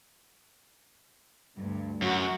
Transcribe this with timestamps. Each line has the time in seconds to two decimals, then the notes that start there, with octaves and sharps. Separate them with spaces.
1.58 D2 G2
2.02 F#2 F#4